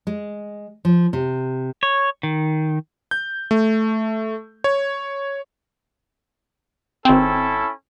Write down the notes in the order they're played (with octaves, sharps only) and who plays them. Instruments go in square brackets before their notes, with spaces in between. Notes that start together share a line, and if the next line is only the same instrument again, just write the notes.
[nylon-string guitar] G#3
F3
C3
[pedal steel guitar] C#5
D#3
[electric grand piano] G6
A3
C#5
[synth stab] G#1 C4 [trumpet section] C#4 E4 A4